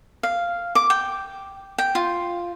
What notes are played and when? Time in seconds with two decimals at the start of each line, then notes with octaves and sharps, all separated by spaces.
0.23 F5
0.75 D6
0.90 G5
1.78 G5
1.95 F4